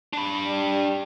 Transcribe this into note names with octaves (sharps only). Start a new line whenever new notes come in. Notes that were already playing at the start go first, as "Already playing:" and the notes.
D4 B5
G3